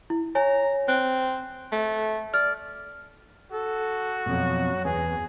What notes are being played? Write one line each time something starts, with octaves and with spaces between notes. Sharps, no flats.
E4
C#5 G#5 A#5
C4 F#6
A3
D5 F6
F#4 A4
F2 B2 F#3
E2 G#4